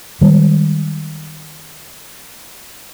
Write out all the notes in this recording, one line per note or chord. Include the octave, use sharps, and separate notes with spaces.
D#3 G3 G#3